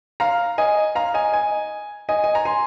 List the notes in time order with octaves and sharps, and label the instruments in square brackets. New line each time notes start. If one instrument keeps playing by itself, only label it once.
[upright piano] F5 A#5
D#5 G#5
F5 A#5
D#5 G#5
D#5 G#5
D#5 G#5
G#5
A#5
G#5 C6